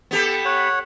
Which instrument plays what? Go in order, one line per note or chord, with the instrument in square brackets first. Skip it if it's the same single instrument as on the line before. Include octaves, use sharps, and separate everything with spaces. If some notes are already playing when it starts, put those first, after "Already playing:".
[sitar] B3 G4 A4
[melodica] C#5 F#5